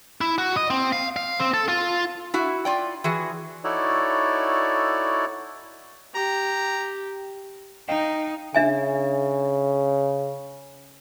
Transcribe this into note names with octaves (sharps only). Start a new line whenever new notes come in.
E4
F#4
D#5
C4
F5
F5
C4
A4
F4
E4 F#4
F4 D5 G5
E3 F#4 G#4
D#4 E4 F#4 A4 C#5 D5
G4 A#5
D#4 D#5 F5 G5
C#3 D4 E5 G#5